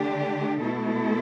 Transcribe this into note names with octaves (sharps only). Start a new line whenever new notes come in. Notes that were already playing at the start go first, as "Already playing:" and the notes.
Already playing: D3 A3 D4 G4
B2 A3 E4 A4